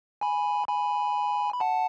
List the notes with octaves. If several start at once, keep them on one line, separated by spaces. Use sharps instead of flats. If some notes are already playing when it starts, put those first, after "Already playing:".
G#5 B5
G#5 B5
B5
F#5 A5